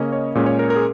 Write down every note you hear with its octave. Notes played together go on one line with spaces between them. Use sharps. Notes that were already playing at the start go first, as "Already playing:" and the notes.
Already playing: C#3 A#3 C#4 D#5
C#5
A#2 G#3 C#4
C#5
A#4
A#4
G#4